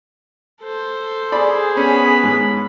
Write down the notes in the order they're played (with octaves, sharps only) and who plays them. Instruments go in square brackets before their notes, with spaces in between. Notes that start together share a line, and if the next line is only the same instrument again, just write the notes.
[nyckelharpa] A4 C5
[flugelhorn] G#4 [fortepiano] D5 B5
[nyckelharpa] B3 B5 [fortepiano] C#4
[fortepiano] G#2